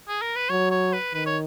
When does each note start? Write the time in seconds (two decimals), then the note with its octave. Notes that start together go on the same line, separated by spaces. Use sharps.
0.09 G#4
0.22 A#4
0.36 B4
0.50 F#3 C#5
0.72 C#5
0.93 B4
1.15 D#3 B4
1.26 C#5